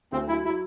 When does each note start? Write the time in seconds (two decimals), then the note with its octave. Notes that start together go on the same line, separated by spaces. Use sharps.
0.12 D2 C4
0.27 F#3 E4
0.44 F#3 E4